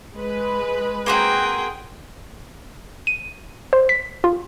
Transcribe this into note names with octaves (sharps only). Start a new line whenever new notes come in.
G#3 B4
A#3 C4 F#4 G#4 G5
D#7
C5
B6
F4